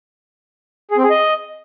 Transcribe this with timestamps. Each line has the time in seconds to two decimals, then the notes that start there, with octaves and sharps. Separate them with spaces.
0.91 G#4
0.97 C4
1.04 G#4
1.10 D#5